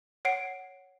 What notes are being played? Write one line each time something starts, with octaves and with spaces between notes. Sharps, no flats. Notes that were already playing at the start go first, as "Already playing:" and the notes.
C#5 F#5 C7 D7